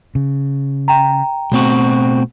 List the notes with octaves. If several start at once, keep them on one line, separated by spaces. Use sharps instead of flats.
C#3
G5 A#5
B2 A3 C4 F#4